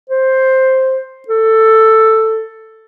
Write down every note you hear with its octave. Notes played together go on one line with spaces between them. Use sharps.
C5
A4